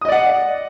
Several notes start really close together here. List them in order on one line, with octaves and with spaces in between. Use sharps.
D#6 D#5 D5 F#5